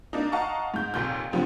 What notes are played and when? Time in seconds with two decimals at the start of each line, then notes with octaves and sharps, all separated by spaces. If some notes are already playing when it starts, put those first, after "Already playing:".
0.13 A#3 D4 D#4
0.32 D#5 F5 F#5 A5 A#5 C#6
0.74 G#2 G6
0.94 F1 D#2 A#2 G6
1.31 G2 D3 F3 G3 C4